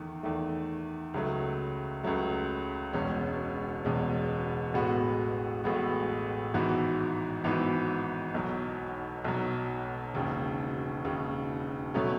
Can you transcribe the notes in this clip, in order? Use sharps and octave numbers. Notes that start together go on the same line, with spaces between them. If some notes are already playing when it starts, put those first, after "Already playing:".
Already playing: E2 D#3 A3
E2 D#3 A3
C#2 C#3 F#3 A3
C#2 C#3 F#3 A3
E1 E2 B2 G#3 C#4
E1 E2 B2 G#3 C#4
A1 A2 G#3 B3 F#4
A1 A2 G#3 B3 F#4
G#1 G#2 E3 B3 F#4
G#1 G#2 E3 B3 F#4
B1 B2 F#3
B1 B2 F#3
E1 D#2 C#3
E1 D#2 C#3
B2 F#3 A3 C#4